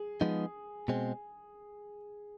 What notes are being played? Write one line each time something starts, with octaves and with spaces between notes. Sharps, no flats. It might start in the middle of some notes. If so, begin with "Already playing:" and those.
Already playing: G#4
F3 G#3 B3 D#4
B2 G#3 C4